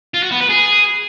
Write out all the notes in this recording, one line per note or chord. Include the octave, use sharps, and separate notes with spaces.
F4
F#4
B3
B4
G#4